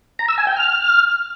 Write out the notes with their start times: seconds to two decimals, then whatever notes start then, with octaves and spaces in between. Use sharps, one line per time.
0.19 A#5
0.28 E6
0.38 G#5
0.47 G5
0.56 F6